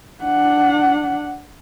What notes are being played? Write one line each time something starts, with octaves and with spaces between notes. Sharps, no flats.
D4 F#5